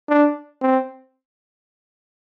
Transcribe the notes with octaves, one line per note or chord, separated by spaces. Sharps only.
D4
C4